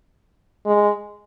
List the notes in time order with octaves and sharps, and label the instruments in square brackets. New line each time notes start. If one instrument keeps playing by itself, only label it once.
[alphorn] G#3